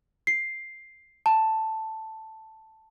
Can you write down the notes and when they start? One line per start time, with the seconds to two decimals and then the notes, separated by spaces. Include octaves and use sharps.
0.27 C7
1.26 A5